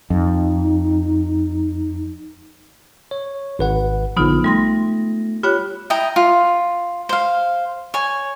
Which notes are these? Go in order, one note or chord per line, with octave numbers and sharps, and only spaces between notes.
F2 D#4
C#5
G#1 B4 F#5
A#1 D3 F3 B3 D#4 F4
G3 A3 C6 A#6
F4 G4 C#5 B5 F#6
E4 G5 A#5 D#6
F4
C5 F5
C#5 G#5